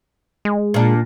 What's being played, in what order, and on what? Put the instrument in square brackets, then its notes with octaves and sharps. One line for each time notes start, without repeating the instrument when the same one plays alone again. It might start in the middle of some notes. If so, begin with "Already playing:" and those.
[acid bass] G#3
[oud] A#2 D4